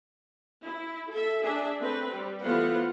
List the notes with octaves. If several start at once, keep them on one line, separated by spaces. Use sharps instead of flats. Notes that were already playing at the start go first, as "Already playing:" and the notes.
E4
A4 E5
D4 G#4 E5
A3 C4 B4
G3
E3 A3 B3 F4 C5 F#5